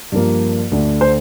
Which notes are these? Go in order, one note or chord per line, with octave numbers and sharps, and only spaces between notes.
G2 F3 A#3
D2 D3 A3
C5